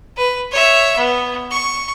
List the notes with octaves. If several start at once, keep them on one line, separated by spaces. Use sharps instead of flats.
B4
C#5 E5
B3
C#6